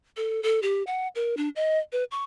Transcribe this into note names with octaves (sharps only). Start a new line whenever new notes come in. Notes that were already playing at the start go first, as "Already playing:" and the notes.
A4
A4
G4
F#5
A#4
D4
D#5
B4
C#6